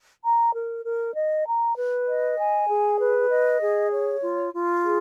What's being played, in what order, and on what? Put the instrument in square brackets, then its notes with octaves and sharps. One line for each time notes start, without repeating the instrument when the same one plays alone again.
[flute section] A#5
A#4
A#4
D#5
A#5
B4
D#5
G#5
G#4
B4
D#5
G#4
C#5
F4
F4
G#4